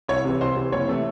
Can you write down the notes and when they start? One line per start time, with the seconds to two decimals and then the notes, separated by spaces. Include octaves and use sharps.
0.08 C2 C#5
0.25 C3 E3
0.40 C2 C5
0.56 C3 E3
0.72 F#1 C#5
0.87 C3 E3 A3